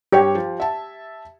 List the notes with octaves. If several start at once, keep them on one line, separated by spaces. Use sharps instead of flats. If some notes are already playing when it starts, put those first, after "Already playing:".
G2 G4 C#5 G5
F3
E5 A5